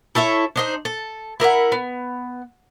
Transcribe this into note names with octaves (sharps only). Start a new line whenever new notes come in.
E4 A4 C#5 E5
D4 D#4 C5
A4
E4 A#4 D#5 F#5
B3